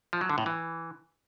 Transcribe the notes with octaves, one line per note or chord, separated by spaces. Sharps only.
F3
F#3
D3
A2
E3